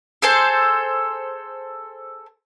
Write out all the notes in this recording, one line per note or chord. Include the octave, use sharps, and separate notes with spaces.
G#4 A4 C5 A5